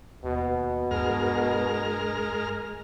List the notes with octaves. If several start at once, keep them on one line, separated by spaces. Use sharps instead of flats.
D#2 B2
G2 G#3 A#4 F6